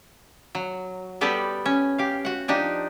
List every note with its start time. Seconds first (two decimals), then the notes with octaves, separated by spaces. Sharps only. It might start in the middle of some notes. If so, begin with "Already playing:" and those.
0.55 F#3
1.21 G3 B3 G4 A4 B4 D5
1.66 C#4
1.98 G4 F5
2.25 F#4 F#5
2.48 F3 D4 D#4 G4